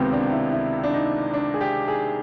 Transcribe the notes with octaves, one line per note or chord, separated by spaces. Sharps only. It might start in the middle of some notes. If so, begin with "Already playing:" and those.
Already playing: C#2 C3 D#3 B3 C4
D4
E4
E4
D4
D#4
D4
G#4
G4
G#4